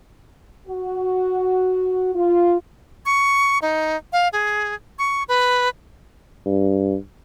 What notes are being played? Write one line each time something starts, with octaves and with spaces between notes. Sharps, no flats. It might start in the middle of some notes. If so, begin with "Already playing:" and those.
F#4
F4
C#6
D#4
F5
G#4
C#6
B4
G2